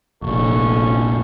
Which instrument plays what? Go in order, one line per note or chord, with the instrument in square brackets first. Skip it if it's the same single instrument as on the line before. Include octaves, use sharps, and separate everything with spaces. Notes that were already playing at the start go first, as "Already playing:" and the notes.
[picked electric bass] F1 A#1 [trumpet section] C#4 A4 C#6